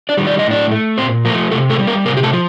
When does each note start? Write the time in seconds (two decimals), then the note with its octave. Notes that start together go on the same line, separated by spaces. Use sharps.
0.09 D4 D5
0.17 D#3 G3
0.27 D5
0.39 D#5
0.45 A2
0.51 D4 D5
0.71 A3
0.98 A#2 C4 C5
1.25 F3 A#3 A#4
1.29 A3
1.51 C3 A3 A4
1.70 A3 A4
1.79 G3
1.87 A#3 A#4
2.05 C3 A#3 A#4
2.17 G4
2.23 A3 A4
2.33 F3